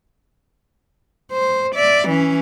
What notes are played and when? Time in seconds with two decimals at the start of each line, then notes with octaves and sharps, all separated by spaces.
1.32 C5
1.76 D5 E5
2.09 E3 C#4